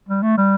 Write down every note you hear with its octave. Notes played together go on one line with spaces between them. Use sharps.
G3
A3
G3